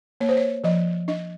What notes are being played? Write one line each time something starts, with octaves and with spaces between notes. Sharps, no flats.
A#3 C#5
C5
C#5
F3 D#5
D4 D#5